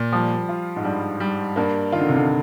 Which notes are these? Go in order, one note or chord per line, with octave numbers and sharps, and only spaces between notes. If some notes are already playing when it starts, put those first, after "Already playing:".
Already playing: A#2
F3 G3
F4
G#2
G2 G3
G3
G2 A#3
D#3 F4
D3
C3
D3